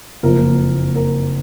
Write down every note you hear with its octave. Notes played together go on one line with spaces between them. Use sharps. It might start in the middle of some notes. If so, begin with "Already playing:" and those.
F#1 F2 F3 A#3 A#4
A#4